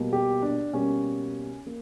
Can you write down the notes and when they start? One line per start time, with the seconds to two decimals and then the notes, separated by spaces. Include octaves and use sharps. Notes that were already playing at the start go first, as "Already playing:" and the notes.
Already playing: B2 G3 A#3
0.13 G4
0.42 D4
0.74 B2 G3 A#3 C#4
1.67 A#3